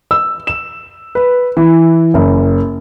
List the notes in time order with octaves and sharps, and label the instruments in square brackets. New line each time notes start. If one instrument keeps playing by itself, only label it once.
[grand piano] E6
E7
B4
E3
F#1